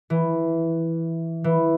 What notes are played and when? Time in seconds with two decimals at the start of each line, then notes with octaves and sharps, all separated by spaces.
0.10 E3
1.44 E3